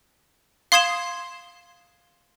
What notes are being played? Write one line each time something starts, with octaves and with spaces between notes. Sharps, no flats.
F5 C6 D#6 G#6 C7 E7